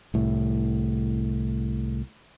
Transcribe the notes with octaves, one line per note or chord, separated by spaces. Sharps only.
C2 A2